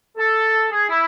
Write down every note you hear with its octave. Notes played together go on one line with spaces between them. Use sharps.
A4
G#4
E4